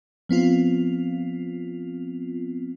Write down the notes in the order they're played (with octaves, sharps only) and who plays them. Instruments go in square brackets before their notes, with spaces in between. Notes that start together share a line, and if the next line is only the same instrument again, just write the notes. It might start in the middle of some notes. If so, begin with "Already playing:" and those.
[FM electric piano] F3 B3 C4 F4